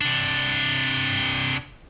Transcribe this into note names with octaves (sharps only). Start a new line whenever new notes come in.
C3 D4